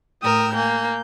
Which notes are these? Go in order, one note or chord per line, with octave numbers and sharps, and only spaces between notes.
A2 A#4 G5 D#6 E6
A#3 G#5 G6